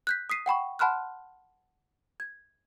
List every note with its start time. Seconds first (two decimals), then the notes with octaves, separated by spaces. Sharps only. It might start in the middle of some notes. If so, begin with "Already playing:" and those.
0.07 F#6 G6 B6
0.30 D#6 B6 C7 D#7
0.46 F#5 G5 B5 C#6
0.79 F#5 A5 B5 C6 F6 F#6
2.20 G#6